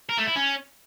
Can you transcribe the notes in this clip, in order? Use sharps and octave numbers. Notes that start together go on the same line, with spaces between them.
A#4
A3
E4
C#4